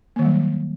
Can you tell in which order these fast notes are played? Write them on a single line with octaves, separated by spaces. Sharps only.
A#3 D#3 G3 F#3